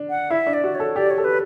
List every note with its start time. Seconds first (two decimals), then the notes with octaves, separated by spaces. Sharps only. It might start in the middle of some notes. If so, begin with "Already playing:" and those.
Already playing: D4
0.09 F#5
0.30 E4 E5
0.47 D4
0.53 D5
0.64 F#4
0.75 C#5
0.80 A4
0.96 G4 D5
1.10 C#5
1.18 A4
1.24 B4